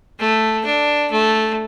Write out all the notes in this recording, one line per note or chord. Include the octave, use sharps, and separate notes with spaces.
A3
D4
A3